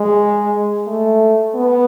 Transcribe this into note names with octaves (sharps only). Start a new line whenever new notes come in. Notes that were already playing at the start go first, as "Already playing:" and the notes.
Already playing: G#3
A3
B3